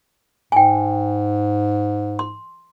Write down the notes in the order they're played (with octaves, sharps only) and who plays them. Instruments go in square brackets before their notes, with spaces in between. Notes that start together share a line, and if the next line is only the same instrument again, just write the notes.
[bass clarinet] G#2 [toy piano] G5 G#5
[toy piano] C6